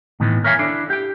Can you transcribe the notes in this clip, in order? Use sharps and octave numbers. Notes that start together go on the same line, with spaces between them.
A2 D#3 E3 B3
A#4 C#5 E5 F5 G5 G#5
D4 E4 A4
G4 G5